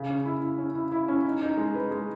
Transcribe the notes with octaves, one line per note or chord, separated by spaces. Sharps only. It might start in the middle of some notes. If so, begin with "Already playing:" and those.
Already playing: C#3
C#4
E4
E4
C#4
E4
E4
C#4
D#4
D#4
G#3
B4
G#3